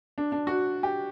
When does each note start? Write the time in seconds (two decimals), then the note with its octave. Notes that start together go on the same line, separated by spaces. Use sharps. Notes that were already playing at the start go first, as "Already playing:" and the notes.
0.18 D4
0.32 D4
0.47 F#4
0.83 G4